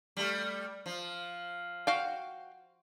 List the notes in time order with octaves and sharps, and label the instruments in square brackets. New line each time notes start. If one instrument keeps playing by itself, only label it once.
[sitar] G3 A3
F3
[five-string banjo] F#4 F5 G5